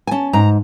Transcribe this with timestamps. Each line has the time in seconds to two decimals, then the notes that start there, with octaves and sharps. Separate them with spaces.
0.07 G#5
0.11 C#4 A5
0.33 G#2 A#5